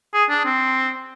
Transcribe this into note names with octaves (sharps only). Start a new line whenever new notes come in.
G#4
D4
C4